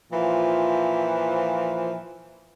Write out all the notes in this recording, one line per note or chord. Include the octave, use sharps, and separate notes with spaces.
A#2 E3 F3